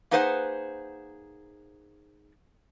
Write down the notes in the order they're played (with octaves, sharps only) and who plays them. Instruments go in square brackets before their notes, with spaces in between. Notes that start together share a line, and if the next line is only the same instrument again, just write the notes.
[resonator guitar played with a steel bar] A#3 D#4 G#4 B4 C5 F#5